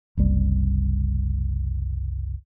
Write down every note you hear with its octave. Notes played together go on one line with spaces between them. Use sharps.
F#1 C2 G3